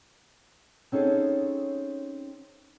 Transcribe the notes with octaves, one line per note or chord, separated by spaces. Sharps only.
C4 C#4 D#4 G#4 A4